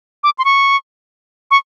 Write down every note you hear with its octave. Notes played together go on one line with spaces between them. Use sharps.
D6
C6
C#6
C#6